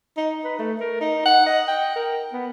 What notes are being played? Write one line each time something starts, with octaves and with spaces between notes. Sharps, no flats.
D#4
B4
A3
A#4
D#4
F#5
D#5
G5
A#4
B3